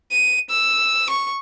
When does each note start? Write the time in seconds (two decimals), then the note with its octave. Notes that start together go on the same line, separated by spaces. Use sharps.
0.11 D#7
0.50 E6
1.10 C#6